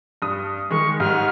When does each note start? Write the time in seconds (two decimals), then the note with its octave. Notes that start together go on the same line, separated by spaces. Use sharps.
0.22 G2 D#6
0.71 D#3 G#3 C#6
1.00 G#2 G3 F6